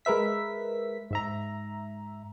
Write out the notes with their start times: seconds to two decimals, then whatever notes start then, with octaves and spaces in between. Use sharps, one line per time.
0.05 G#3 A#4 B4 E5 B6
1.11 G#2 E5 A#5